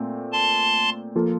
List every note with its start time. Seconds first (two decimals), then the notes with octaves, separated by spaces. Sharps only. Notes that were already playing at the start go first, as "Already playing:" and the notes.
Already playing: A#2 A3 C4
0.32 A5 C6
1.16 F3 A#3 F4 A4